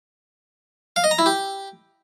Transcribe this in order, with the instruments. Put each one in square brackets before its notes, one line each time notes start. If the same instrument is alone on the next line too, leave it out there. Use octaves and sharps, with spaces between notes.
[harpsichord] F5
D#5
A#5
E4
G4